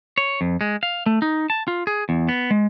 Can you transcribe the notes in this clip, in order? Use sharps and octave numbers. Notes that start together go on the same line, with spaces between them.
C#5
F2
G#3
F5
A3
D#4
A5
F4
G#4
E2
B3
G#3